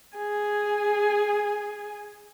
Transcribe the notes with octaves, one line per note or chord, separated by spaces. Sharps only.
G#4 G#5